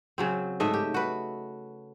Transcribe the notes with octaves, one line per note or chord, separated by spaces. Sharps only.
C#3 F#3 C4
G#2 A3 D#5 E5
G4
F#4 B4